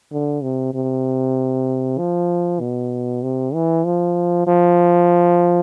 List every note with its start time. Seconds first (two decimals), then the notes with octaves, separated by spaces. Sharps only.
0.12 D3
0.43 C3
0.74 C3
1.98 F3
2.60 B2
3.23 C3
3.54 E3
3.85 F3
4.47 F3